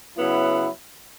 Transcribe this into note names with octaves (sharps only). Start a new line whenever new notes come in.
C#3 F#3 B3 E4